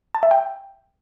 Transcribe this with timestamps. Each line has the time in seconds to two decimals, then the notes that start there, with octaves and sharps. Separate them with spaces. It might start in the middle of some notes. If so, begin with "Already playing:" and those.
0.15 A5
0.23 E5
0.31 G5